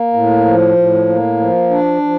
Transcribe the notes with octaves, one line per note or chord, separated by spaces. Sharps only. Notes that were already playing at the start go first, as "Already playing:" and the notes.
Already playing: A#3
A2
F3
A2
A#3
F3
D4
F3